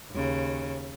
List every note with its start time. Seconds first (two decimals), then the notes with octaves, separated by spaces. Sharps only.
0.12 D#2 C#3